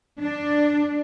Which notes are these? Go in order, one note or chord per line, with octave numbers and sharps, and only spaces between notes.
D4